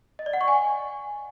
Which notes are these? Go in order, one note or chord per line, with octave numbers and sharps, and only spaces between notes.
D#5
D5
F#5
C#6
G#5